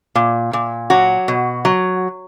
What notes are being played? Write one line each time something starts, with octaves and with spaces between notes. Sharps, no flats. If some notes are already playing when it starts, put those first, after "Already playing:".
A#2
A#2
F#3 F#4
B2
F#3